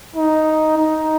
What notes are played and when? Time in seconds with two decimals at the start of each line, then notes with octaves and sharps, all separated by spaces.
0.16 D#4
0.77 D#4